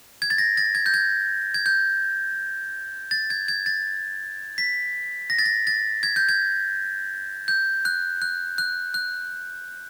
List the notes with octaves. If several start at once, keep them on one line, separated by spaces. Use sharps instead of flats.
G#6
A6
A#6
A6
G#6
G6
G#6
G#6
G6
A6
G#6
G#6
A6
B6
A#6
A6
A#6
A6
G#6
G6
G#6
G6
F#6
F#6
F#6
F#6